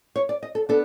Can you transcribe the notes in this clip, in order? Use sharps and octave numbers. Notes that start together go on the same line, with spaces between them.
C#5
D5
D#5
A4
B3 D4 A4